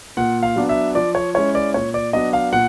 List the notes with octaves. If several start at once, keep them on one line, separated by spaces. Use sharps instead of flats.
A#2 F#5
F5
F#3 B3 D4
E5
F3 D5
C#5
G#3 C#4 E4 C#5
D5
A#2 C#5
D5
F#3 B3 D4 D#5
F5
A#2 F#5